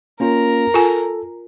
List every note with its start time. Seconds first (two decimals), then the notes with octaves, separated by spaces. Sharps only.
0.20 A#3 C#4 F4 A#4
0.74 F4 A4 G#5